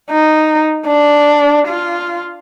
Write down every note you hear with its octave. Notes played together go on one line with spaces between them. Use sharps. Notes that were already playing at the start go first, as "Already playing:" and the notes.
D#4
D4
F4